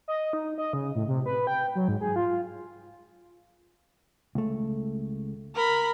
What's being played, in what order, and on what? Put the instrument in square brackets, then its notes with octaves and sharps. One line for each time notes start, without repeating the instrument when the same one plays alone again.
[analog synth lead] D#5
D#4
D#5
C#3
A2
C3
B4
G5
F#3
G#2
G#4
F4
[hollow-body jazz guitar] C#2 A3
[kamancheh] A#4 B5